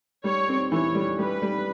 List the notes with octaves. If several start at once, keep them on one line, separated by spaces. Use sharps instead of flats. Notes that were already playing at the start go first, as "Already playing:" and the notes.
G3 C#5
C4
E3 C#5
G3
G3 B4
G3